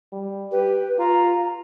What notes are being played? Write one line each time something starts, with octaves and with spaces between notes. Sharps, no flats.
G3
G4 B4
F4 A#5